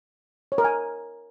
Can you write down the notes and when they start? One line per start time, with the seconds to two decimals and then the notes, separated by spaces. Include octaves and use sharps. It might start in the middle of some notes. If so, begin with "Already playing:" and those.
0.52 C#5
0.58 A#4
0.64 G#5